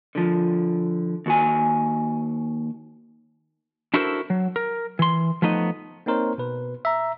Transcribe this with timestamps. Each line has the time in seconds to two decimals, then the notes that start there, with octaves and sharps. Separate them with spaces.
0.15 D3 F3
1.26 D#2 F#4 G#5
3.94 D4 E4 F#4 A4 A#4 C5
4.30 F#3
4.56 A#4
4.99 E3 C6
5.42 F3 A3 B3 D#4 D#5
6.06 A#3 C4 D#4 A#4 C5 C#5
6.38 B2 B4
6.85 E5 A#5